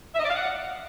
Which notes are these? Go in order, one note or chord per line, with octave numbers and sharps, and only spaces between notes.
E5
D#5
D5
F5
F#5